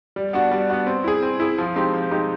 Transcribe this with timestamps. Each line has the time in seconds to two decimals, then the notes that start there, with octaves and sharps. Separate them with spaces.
0.16 G3
0.33 B3 D4 F#4
0.51 G3
0.70 B3 D4 F#4
0.87 C4
1.04 E4 G#4
1.23 C4
1.40 E4 G#4
1.58 F3
1.76 G#3 C4 D#4 G4
1.94 F3
2.11 G#3 C4 D#4 G4